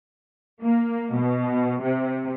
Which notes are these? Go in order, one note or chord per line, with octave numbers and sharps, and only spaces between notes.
A#3
B2
C3